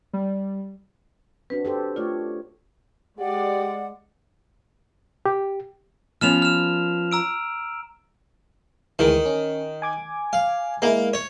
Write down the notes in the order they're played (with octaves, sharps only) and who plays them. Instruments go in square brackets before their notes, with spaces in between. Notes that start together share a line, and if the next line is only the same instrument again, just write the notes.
[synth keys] G3
[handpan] C4 D4 F#4 [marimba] B4
[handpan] G4 A4 C5
[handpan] A3 C#5 D5 [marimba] F4
[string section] G#3 D5 [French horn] G4 [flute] F#5
[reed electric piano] G4
[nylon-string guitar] F3 B3 C#4 [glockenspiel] F6 E7 F7
[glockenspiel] F6 E7
A#5 E6 D7
[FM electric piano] D2 E3 G#3 [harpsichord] D#3
[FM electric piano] C#4
G#5 D6 G#6
[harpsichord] F5
[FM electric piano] G#3 E4 [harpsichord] A#3
[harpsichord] C#5